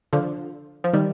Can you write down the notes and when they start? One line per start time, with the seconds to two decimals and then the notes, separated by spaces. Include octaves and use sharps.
0.13 D3 F3
0.84 F3
0.93 D#3 G3